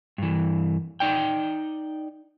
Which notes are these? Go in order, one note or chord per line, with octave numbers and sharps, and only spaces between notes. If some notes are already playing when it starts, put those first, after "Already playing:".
G2 E3
D#4 D5 G5